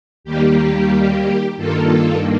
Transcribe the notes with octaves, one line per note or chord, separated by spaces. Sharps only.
D#2 D#3 G3 A#3 G4
G2 D#3 A#3 F4 A4